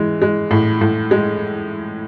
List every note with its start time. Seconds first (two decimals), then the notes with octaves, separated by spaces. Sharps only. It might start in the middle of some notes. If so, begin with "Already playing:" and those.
Already playing: E3 G#3
0.22 G#3
0.51 A2
0.81 A2
1.11 G#3